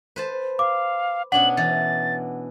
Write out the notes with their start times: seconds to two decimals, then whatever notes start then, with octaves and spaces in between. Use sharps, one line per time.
0.16 B4 C5 A5
0.59 F5 D6
1.32 B2 C#4 D4 F#5 F#7
1.57 E3 A6